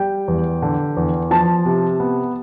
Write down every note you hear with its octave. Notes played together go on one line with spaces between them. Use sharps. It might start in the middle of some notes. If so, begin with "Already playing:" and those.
Already playing: G3 G5
E2
D3
E2
F3 A5
C3
B3